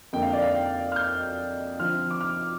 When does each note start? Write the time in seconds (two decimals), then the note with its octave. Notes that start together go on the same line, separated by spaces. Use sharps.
0.13 F2 D3 A#3 G5
0.23 F5
0.33 D5
0.42 F5
0.54 G5
0.92 F6
0.96 G6
1.79 D3 F3 C4 F4 F6
2.11 D6
2.21 F6